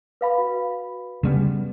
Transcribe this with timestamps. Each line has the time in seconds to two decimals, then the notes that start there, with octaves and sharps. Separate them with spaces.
0.21 B4 F5 B5
0.38 F#4
1.23 C#3 G3 B3